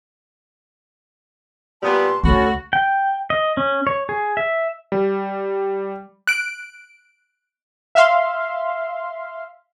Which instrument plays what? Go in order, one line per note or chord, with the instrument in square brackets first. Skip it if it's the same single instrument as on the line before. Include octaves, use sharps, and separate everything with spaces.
[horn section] A#2 G3 B3 [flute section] A5 C6
[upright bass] D2 [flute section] C#4 A4 B5 [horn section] F#4
[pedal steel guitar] G5
D#5
C#4
C#5
G#4
E5
[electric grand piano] G3
[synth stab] F#6 D7
E5 F5 C6